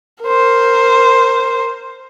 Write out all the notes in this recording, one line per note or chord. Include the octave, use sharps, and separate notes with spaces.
A#4 C5